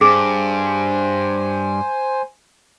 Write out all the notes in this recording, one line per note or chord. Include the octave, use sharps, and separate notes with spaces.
G2 G#4 C5 G#5